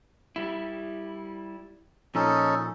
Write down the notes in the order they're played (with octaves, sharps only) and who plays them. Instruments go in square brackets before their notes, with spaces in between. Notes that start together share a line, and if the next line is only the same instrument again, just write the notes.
[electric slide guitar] G3 E4
[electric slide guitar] A#2 F3 [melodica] C#4 D#4 A4